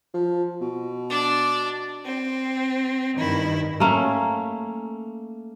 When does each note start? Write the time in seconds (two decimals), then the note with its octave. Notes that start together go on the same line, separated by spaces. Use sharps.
0.14 F3
0.61 B2
1.10 D4 D5
2.04 C4
3.17 G2 D#3 E4
3.80 A3 A#3 C#4